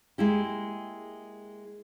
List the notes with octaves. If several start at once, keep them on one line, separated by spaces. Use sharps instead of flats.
G#3 A#3 E4 G4